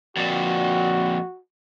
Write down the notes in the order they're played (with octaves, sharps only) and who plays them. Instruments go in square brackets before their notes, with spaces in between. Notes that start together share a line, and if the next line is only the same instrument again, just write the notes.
[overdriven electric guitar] F2 A#2 [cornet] F#4